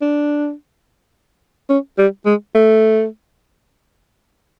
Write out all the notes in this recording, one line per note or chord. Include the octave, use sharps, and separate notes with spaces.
D4
C#4
G3
G#3
A3